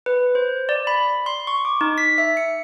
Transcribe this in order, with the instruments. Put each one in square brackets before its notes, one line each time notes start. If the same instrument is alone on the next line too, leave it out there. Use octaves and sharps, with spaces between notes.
[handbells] B4
C5
D5
B5
C6
C#6
D6
D#4
B6
E5
C#7